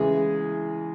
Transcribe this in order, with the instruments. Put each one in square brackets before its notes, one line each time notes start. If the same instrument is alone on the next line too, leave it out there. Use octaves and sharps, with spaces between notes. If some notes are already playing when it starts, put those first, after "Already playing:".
Already playing: [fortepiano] E2 C#3 E3 G#3 G#4